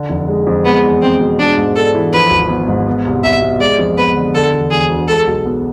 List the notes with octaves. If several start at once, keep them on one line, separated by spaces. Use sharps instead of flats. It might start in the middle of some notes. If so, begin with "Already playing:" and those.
Already playing: D3
F1
G#3
F2
G#3 B3
E2
E2 C4
B2
G#3 D4
G#2
D4 A4
E3
F3 B4
G#1
B3
G#2
B3
C2
C2 E5
B2
G#3 D5
F2
B3 B4
D3
D3 A4
E1
E1 G#4
D2
G#3 A4
B1
B3